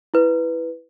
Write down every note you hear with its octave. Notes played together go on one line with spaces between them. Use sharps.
E4 B4